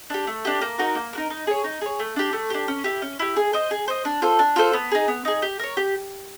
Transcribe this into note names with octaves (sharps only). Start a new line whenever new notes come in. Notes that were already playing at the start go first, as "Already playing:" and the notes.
D4 G4
A3
D4 G4
A#3
D#4 F#4 A#4
A#3
D#4 F#4 A#4
D#4
G#4 C#5
D#4
G#4 C#5
A3
D4 G4
A3
D4 G4
C#4
E4 G4
C#4
E4 G4
G#4
C5 D#5
G#4
C5 D#5
D4
F4 A4 C5
D4
F4 A4 C5
B3
D#4 G#4
B3
D#4 G#4
G4
A#4 C#5
G4